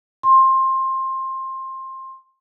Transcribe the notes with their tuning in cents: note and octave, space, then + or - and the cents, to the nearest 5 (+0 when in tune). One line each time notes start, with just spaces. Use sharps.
C6 +20